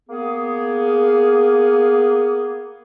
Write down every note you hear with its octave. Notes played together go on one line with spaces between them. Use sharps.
A#3 B3 G#4